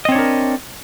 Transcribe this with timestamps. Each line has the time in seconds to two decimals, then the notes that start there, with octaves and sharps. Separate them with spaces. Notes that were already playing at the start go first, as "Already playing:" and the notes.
0.05 D#5
0.09 C4
0.12 C#5
0.15 D4
0.19 A#4